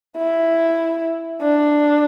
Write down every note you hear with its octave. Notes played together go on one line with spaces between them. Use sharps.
E4
D4